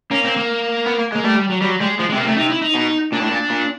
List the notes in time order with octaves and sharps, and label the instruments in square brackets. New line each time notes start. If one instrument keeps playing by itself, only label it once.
[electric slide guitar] A#3 [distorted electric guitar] C#4
[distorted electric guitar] C4
A#3
[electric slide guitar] B3
A#3
G#3
[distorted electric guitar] A#3
[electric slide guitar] G3 [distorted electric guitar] A3
[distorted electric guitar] G3
F#3
[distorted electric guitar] F#3 [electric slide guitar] G3
[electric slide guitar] G3 [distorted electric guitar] G#3
[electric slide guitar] F3 [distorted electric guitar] G#3
[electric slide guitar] C3 [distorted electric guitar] G#3
[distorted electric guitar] A#3
[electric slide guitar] C3
[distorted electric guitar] A3
[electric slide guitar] C3 [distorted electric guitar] D#4
[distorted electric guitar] E4
D#4
[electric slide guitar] B2
[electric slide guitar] A#2 [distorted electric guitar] D4
[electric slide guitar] A2
A#2
A#2